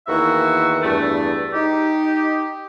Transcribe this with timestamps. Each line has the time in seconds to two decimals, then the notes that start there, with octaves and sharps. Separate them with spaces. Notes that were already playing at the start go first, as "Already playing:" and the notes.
0.08 E2 D#3 E3 A#3 F#4 E5
0.83 E2 G2 A3
1.53 D#4 G4